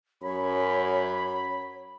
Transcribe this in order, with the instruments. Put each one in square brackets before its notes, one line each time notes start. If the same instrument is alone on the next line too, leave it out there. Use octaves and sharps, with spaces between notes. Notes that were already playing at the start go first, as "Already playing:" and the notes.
[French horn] F#2 [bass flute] C#5 [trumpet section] B5